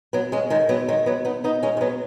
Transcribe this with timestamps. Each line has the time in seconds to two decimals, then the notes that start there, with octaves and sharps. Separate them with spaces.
0.13 F#3 B3
0.32 G#3 C#4
0.50 D#3 G#3
0.69 F#3 B3
0.88 D#3 G#3
1.06 F#3 B3
1.25 B3 D#4
1.44 B3 D#4
1.63 G#3 C#4
1.77 G#3
1.81 F#3 B3